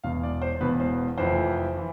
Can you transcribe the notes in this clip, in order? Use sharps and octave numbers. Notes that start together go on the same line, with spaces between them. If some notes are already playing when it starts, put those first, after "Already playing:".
E1 E2 B2 F5
D5
C5
E1 E2 B2 B4
C5
F1 F2 E3 C5
E3